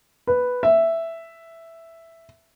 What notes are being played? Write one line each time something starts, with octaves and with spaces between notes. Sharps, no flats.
B4
E5